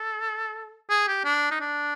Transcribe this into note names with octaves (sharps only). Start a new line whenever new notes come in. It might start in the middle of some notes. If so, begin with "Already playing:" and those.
Already playing: A4
G#4
G4
D4
D#4
D4